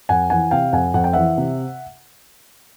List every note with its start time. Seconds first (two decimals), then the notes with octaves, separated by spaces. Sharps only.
0.09 F2 F#5 G#5
0.30 E3 F#5 G#5
0.51 C3 F5 G5
0.73 F2 F#5 G#5
0.94 F2 F#5
1.04 G5
1.13 E3 E5 F#5
1.38 C3